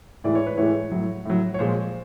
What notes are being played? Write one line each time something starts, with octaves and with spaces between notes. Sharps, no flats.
A2 E3 G#3 D5
C#5
B4
A2 E3 G#3 C#5
A2 F#3
A2 F#3
C#5
A#2 F3 G#3 C5